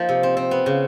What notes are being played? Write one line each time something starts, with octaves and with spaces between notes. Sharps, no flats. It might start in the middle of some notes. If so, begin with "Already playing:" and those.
Already playing: F3 A#3 D#4
C3
C4
C4
B3
C#3